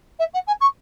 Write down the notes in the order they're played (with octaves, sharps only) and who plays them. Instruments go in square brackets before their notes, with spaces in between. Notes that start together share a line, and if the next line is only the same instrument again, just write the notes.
[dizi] E5
F#5
G#5
C#6